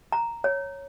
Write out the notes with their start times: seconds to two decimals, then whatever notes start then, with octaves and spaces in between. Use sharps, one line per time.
0.12 A#5
0.44 C#5